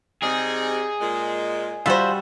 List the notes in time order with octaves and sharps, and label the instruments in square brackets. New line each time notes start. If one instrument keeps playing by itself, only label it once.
[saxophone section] C3 G3 D#4 [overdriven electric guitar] G#4
[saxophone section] A#2 G#3
[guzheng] G3 F#4 E5 [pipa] F4 C5